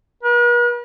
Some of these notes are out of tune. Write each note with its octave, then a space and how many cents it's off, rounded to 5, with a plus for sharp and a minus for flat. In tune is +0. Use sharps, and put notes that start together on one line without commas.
B4 -45